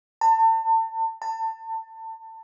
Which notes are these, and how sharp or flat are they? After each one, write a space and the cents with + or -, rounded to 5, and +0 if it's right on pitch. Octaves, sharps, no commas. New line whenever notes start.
A5 +35
A5 +25